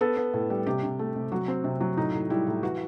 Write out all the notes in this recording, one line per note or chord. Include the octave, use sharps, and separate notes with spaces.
B3 A4
B3
A2
G3
C3 G4
C3
A3
C3
F#3 F#4
C4
C3
F#3
A2 D#4
A2
G3 E4
A2
E3 F#4